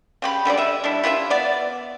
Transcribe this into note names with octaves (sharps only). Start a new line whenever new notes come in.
C#3 G4 B5
D3 G3 G#3 D5
D#5 E5
G3 D4 E4
E4 F4 A#4 E5
B3 D5